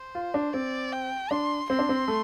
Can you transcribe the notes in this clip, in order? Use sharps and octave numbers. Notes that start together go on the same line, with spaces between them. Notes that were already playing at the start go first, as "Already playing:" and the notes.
Already playing: C5
F4
D4
C4 D5
G5
D4 C6
C4 C6
D4
C4
A3